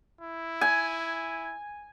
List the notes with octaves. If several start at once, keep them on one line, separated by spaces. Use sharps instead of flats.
E4
G#5